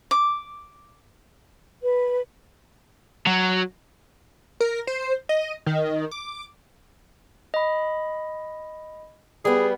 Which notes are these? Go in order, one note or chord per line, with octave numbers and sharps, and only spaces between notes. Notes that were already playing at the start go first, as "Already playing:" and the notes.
D6
B4
F#3
A#4
C5
D#5
D#3
D6
D#5 B5
G3 B3 G#4